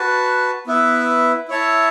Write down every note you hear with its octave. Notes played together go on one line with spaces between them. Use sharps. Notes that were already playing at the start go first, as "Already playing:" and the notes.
Already playing: F#4 B4 A5
B3 E4 B4 E5
E4 C#5 E5 A5